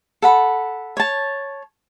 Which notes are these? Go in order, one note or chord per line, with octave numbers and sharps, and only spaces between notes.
A4 F#5 B5
C#5 A5